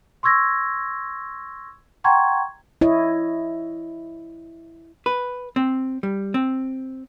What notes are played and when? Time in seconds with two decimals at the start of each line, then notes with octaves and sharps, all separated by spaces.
0.23 C6 C#6 E6 G#6 A#6
2.04 F#5 G5 A#5 C6 C#6 G#6
2.81 E4 C#5 D#5
5.06 B4
5.56 C4
6.03 G3
6.34 C4